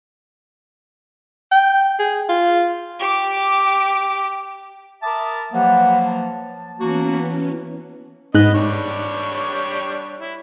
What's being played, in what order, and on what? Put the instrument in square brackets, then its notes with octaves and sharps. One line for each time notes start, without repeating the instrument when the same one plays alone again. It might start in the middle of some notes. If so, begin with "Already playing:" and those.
[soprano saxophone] G5
G#4
F4
[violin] G4 D6
[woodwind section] A#4 E5 A5 [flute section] B5 D6 D#6
[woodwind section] F3 F#3 A#3 [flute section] G4 B4 F#5
[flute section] A5
[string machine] E3 B3 C#4 [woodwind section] A#3 F#4
[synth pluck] G#2 F#6 [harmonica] B3 D#5
[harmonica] G3 D4 C#5
E4